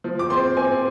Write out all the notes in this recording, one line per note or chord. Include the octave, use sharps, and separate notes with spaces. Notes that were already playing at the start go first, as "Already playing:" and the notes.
F3
D6
C4 C6
C4 G#5